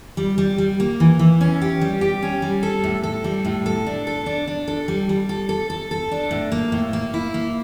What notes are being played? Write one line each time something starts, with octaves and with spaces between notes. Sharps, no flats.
G3
G3
G3
A#3
E3
E3
C#4
G4
G3
G4
C#4
G3
A4
A2
A4
G3
A2
A4
D4
A4
D4
D4
A4
G3
G3
A4
A4
A4
A4
D4
A2
A#3
A2
A#3
E4
A#3